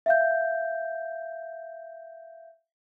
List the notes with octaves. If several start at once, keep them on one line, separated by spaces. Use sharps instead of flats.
E5 F5 G6